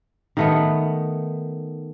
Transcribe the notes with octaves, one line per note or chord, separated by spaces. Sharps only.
D#3 A3 B3